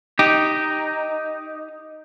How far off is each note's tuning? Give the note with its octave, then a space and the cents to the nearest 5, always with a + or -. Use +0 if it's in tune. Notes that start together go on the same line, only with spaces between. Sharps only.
D#4 +0 G4 +0